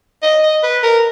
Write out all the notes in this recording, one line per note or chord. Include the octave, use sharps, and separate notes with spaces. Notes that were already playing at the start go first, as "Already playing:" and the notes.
D#5
D#5
B4
A#4